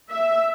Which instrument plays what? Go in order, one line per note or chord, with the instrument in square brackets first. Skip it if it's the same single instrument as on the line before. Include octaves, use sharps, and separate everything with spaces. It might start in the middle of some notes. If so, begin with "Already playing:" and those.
[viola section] E5